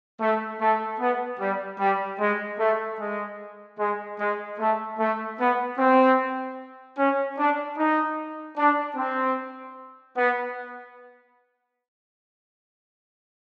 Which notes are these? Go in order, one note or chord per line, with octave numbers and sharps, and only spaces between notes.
A3
A3
B3
G3
G3
G#3
A3
G#3
G#3
G#3
A3
A3
B3
C4
C#4
D4
D#4
D4
C4
B3